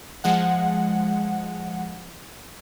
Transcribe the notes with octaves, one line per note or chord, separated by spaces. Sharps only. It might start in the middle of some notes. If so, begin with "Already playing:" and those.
F3 G#3 F#5